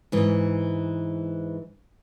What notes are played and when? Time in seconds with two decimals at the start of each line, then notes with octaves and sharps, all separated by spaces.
0.12 G#2 E3